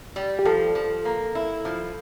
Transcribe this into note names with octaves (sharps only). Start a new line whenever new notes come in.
G3
G4
F3 A4
F3
A#3
E4
F3